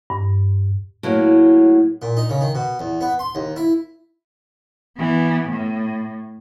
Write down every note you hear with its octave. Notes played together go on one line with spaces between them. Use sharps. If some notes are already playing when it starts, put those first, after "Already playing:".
G2
A2 F#3 A#3
A#2
D#4
C#3
D#3
B2
E2
B3
C6
D#2
E4
E3 B3
A2